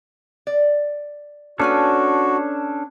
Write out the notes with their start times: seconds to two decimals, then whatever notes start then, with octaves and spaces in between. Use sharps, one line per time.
0.47 D5
1.59 A#3 C#4 D4 F#4 A4 B4 G#5